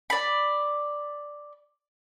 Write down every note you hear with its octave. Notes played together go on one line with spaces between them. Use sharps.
D5 B5